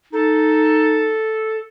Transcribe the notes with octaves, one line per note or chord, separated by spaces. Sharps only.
D#4 A4